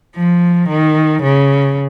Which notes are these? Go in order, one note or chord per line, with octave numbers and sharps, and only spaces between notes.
F3
D#3
C#3